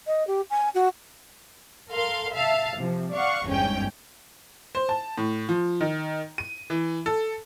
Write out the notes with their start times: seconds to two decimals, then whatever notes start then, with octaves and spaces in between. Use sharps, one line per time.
0.07 D#5
0.27 G4
0.50 G#5
0.74 F#4
1.90 A4 A#4 F5 C6
2.33 E5 F5 A5
2.76 C3 F3
3.14 D5 F5 F#5 C#6
3.47 G1 E2 G#2 C#4 G5
4.75 C5
4.89 A5
5.18 A2
5.49 F3
5.81 D#3
6.38 D#7
6.70 E3
7.06 A4